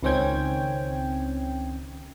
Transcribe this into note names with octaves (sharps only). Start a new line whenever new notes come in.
C#2 D#3 C4 C#4 G5 G#6